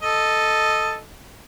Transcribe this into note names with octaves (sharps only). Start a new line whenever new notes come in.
A4 D#5